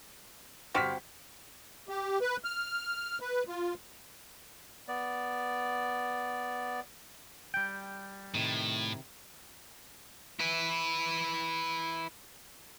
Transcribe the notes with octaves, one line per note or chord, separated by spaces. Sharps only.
G1 C4 F#4 G4 F6 B6
G4
B4
F6
B4
F4
B3 D5
G3 G5
A2 C3 D#3
E4 B4